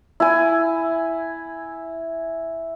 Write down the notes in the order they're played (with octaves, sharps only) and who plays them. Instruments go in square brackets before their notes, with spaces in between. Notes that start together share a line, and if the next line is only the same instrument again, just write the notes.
[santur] E4 G#5